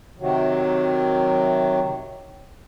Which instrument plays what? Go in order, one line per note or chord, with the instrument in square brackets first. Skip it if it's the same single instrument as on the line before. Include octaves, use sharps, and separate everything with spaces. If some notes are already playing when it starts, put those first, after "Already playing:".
[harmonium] C3 D#3 F#3